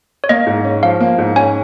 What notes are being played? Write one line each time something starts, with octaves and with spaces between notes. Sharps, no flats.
C#5
A#3 D#5
G#2
C#4
F3 F5
A#3
G#2
C#4 G#5